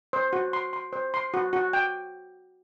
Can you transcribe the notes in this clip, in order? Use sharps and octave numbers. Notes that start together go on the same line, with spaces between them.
C5
F#4
C6
C6
C5
C6
F#4
F#4
G5